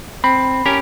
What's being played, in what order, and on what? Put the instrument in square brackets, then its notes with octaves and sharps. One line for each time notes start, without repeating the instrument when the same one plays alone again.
[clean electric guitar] C4 [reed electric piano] B5
[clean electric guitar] C#4 G4 A#4